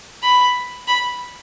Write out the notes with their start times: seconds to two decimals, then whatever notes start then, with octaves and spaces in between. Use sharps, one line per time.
0.23 B5
0.87 B5